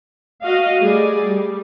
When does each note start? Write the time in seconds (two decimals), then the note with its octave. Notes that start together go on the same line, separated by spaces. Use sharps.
0.43 F#4 D#5 F5
0.80 G3 A3 G#4 D5
1.28 G3